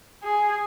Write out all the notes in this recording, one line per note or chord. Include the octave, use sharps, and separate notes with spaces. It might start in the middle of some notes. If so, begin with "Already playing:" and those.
G#4